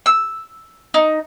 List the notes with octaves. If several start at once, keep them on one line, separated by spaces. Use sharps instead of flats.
E6
D#4